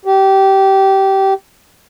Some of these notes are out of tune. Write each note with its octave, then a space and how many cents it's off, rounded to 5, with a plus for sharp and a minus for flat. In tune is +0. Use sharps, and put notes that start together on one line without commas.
G4 -20